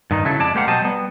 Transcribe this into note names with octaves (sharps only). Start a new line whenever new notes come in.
G2 D#3 D#4
C#3 F#3 E4 A4
F2 G#3 D5 A5
G#3 A#3 G4 C5 F5 F#5
B2 F#3 G4 C5 D#5 A5
G3 B3